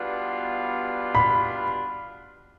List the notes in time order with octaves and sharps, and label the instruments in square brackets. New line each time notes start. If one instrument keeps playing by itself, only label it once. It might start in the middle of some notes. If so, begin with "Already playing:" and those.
Already playing: [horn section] B2 G3 B3 D4 F4
[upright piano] B5